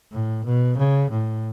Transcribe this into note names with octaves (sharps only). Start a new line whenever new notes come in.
A2
B2
C#3
A2